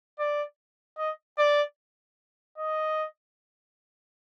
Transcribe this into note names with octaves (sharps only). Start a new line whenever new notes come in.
D5
D#5
D5
D#5